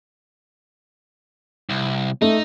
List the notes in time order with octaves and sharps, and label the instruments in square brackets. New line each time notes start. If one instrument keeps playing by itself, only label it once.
[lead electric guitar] C2
[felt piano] A3 [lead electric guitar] D#4